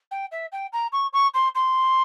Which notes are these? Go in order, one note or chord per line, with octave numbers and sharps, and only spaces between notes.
G5
E5
G5
A#5
C#6
C#6
C6
C6